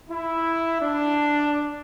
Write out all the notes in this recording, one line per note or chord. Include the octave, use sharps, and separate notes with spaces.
E4
D4